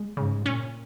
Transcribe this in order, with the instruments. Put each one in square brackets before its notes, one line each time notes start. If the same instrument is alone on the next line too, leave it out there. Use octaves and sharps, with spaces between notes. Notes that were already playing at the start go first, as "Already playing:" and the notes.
Already playing: [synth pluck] G#3
[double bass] G#2 [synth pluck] C#3
[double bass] A#2 [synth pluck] C#4